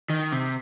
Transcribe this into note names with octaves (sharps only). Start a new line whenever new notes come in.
D#3
C3